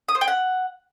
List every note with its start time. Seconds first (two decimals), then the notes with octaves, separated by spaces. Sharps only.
0.08 D#6
0.15 C5
0.21 G5
0.28 F#5